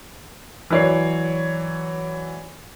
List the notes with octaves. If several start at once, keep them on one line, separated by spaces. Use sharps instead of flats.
E3 F#3 C#5 D5 C7